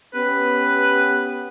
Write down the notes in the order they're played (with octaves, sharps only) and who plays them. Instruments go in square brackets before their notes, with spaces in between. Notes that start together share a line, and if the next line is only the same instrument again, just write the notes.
[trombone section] B3 C#4 G4 [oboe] B4